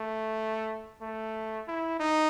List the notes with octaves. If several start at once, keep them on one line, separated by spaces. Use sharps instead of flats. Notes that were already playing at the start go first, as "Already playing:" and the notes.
Already playing: A3
A3
E4
D#4